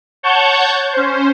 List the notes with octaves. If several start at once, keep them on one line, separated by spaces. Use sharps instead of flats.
C#5 F#5 A5 C#6 G6
C#4 C5